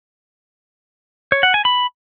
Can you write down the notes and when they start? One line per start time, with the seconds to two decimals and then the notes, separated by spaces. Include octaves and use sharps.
1.32 C#5
1.43 F#5
1.54 G#5
1.65 B5